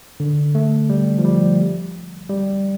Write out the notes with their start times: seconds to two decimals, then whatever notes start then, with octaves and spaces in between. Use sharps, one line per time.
0.20 D3
0.55 A3
0.90 G3
1.18 F3
1.25 G3
2.29 G3